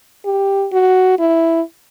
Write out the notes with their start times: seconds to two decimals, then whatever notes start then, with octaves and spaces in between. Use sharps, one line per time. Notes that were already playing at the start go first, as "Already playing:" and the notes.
0.25 G4
0.72 F#4
1.19 E4